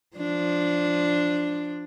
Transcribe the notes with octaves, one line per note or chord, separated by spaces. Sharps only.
F3 D4